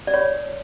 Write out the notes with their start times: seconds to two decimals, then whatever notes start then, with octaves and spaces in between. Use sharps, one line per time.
0.07 D5
0.14 C#5